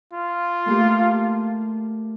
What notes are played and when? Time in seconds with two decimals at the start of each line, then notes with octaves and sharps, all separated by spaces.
0.13 F4
0.66 A3 A#3 G4